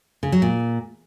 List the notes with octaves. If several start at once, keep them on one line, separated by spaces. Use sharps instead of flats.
C#3
F#3
A#2